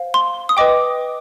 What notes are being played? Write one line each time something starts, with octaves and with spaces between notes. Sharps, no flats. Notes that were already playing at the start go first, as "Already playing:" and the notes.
Already playing: C5 F5
C6
D#6
B4 D#5 G5 D6